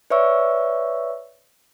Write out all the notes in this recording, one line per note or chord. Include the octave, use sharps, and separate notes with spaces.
B4 C#5 D5 E5 C#6 E6